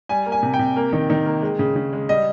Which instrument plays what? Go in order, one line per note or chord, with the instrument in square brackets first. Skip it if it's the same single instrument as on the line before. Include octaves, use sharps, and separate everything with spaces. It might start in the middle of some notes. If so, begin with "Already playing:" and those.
[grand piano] G3 G#5
A#3
G#5
C3
G5
C3
A#3
D#3
D#3
A#3
G#3
C#3
C#3
G#3
G3 D#5